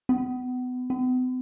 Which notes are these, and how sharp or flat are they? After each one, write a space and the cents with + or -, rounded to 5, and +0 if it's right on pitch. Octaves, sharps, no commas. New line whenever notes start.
B3 +30
B3 +45